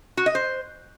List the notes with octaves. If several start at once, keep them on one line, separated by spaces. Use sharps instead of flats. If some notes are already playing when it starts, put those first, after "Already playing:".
F#4
D#5
C5